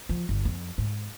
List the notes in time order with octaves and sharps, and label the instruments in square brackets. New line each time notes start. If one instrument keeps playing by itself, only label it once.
[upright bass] F3
G1
F2
G#2